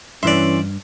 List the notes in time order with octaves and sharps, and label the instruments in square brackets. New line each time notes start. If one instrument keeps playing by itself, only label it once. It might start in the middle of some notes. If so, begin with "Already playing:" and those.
[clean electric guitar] G2 [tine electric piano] E3 C6 [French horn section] C#4 [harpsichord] D5 E5